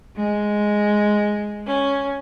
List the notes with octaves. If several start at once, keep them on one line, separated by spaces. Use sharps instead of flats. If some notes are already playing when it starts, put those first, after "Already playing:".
G#3
C#4